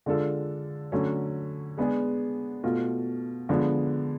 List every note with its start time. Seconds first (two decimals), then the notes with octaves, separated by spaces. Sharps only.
0.06 D3 G#3 D4 F4 A4
0.92 D3 F#3 A3 C#4
1.78 G#3 B3 D4 G#4
2.64 B2 A3 F4
3.49 D3 F3 G#3 B3 D4